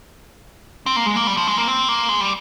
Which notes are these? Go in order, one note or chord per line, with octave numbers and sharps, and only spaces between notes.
C4
A#3
G#3
A#3
G3
F3
G#3
A#3
C4
A#3
G#3
G3